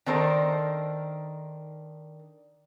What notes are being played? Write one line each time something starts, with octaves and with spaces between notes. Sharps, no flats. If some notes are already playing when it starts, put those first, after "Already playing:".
D#3 D4 D#4 A4 A#4 C5